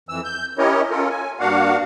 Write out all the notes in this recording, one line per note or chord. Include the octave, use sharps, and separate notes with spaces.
F2 E3 E6
G6
C#4 E4 G4 A#4 C#5 D#5
C#4 F4 A4 A#4
G#5
G2 A#3 D4 F#4 F5 F#5